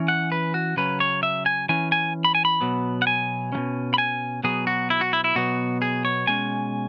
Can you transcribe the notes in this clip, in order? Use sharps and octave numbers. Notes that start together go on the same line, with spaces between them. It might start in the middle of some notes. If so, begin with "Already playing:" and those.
Already playing: E3 C#4
F#5
B4
F#4
C#3 F#3 C#4 B4
C#5
E5
G#5
E3 C#4 G#5
G#5
B5
G#5
B5
B2 F#3 B3
F#5
G#5
B2 F#3 C#4
B5
G#5
B2 F#3 B3 G#4
F#4
E4
F#4
E4
E4
B2 F#3 B3 F#4
G#4
C#5
B2 G#3 C#4 G#5